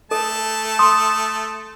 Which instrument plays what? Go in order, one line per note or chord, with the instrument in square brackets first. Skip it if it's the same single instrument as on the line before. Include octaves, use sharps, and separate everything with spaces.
[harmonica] A3 A5 [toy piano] A4
[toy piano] C6 [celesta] D#6